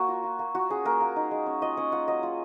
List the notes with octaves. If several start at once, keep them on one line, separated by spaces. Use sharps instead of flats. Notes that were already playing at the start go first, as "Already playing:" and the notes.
Already playing: A#3 F#4 A#4 C#5
F4
F4
A#3
F4 F#4
C#4 G#4
A#3 A#4
A#3
D#4
G#3
C#4
F4 D#5
C#4 F#5
F4 F#5
F#3 D#5
F4